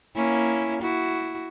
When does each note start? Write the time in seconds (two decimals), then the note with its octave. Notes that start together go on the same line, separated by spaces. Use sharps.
0.15 A#3 C#4 E4
0.82 E4 F#4